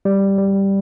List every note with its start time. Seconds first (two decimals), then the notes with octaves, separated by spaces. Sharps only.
0.05 G3
0.38 G3